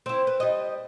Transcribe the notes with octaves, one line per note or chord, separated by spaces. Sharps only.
C4 E4
B4
G3 D#5